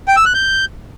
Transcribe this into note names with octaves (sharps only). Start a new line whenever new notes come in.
G5
E6
F#6
G6